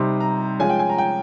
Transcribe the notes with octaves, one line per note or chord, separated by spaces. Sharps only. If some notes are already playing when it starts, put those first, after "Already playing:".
Already playing: C3 G3 C4 D#4 C6
A#5
F3 G#3 C#4 F4 G#5
G5
G#5
A#5
G5